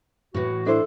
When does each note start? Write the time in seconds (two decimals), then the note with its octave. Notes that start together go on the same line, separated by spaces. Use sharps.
0.34 A2 E3 F#4
0.66 D4 E4 A4 C5